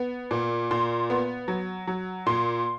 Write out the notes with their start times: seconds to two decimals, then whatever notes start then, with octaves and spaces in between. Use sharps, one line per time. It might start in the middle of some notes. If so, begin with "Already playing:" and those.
Already playing: B3
0.31 A#2
0.71 A#2 C6
1.10 B3
1.48 F#3
1.87 F#3
2.26 A#2 C6